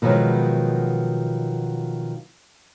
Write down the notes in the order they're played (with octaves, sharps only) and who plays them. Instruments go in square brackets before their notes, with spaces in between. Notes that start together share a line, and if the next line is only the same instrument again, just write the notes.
[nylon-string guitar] B2 D#3 F3 F#3 G#3 B3